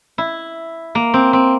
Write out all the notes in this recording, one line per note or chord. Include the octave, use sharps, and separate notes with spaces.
E4
A#3
C4
C4